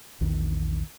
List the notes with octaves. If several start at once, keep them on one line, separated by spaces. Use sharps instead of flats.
A#1 E2 D#3